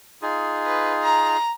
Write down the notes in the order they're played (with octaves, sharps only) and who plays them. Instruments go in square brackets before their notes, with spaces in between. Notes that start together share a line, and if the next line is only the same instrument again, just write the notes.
[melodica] D#4 F4 G#4
[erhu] B4
A#5